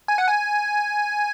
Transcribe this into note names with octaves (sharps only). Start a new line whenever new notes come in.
G#5
F#5
G#5